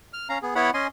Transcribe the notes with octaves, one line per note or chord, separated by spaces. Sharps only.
F6
C#4 F5 A#5
B3 G#4
B3 E4 C#5 F#5 B5
C#4 D#5 G#5 C6